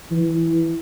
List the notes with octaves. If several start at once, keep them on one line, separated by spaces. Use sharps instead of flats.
E3